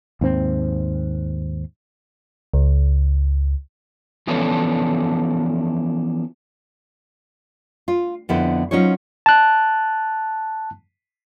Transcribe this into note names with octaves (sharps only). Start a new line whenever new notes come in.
D#2 G#2 C4
C#2
E3 F3 B3 C#4 D4 A4
F4
F2 D3 B3 E4 A4 C5
F#3 C#4 D#4 F4 C5 C#5
A5 F#6